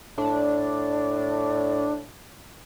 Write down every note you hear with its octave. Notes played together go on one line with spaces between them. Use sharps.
A2 D4